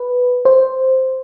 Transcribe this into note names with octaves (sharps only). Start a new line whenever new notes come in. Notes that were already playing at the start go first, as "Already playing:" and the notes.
Already playing: B4
C5